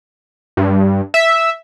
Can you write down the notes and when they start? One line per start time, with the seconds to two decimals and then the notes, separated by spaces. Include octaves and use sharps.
0.57 G2
1.14 E5